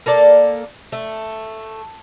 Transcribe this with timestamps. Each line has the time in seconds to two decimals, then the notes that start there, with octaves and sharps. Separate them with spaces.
0.06 A#3 A4 D5
0.92 A3